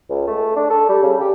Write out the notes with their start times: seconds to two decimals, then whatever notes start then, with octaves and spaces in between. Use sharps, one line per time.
0.10 C#2
0.27 A3
0.56 D4
0.70 A4
0.89 G3
1.03 C#3
1.20 G4